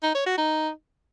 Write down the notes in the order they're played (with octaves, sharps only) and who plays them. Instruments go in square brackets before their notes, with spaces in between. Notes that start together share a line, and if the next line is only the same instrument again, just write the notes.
[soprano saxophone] D#4
C#5
F#4
D#4